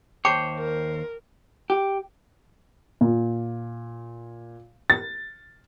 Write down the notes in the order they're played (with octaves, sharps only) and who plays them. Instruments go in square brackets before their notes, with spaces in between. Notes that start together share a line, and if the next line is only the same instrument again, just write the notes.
[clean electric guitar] D#2 C5 C#5 [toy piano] G5 A5 D6
[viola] A#4
[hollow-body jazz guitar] G4
[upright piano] A#2
A6